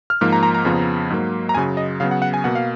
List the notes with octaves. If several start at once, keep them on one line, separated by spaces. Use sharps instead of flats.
F6
G#2 F3 A#3 F6
A#5
A#5
A#5
F2 C#3 F3 B3
G#2 F#3 A#3
A#5
F#2 C#3 F#3 G#5
D#5
C#3 F#3 B3 F5
F#5
F#5
G#5
B2 A#3 F#5
F5